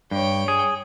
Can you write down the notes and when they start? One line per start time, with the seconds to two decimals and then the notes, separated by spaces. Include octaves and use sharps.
0.11 G2 C#5 G5
0.48 G#4